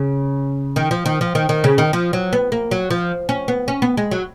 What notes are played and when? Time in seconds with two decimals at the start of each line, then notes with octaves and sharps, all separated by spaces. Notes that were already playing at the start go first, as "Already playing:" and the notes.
Already playing: C#3
0.76 D#3
0.91 F3
1.06 D#3
1.21 F3
1.35 D#3
1.49 D#3
1.64 C#3
1.78 D#3
1.93 F3
2.13 F#3
2.33 B3
2.52 A#3
2.71 F#3
2.90 F3
3.29 C#4
3.48 B3
3.68 C#4
3.82 B3
3.97 G#3
4.11 F#3